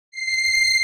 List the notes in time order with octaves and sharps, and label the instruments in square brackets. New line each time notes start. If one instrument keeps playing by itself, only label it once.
[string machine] C7